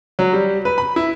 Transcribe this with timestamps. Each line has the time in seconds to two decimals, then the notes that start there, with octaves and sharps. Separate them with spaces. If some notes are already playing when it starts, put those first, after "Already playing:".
0.19 F#3
0.33 G3
0.65 B4
0.78 B5
0.96 E4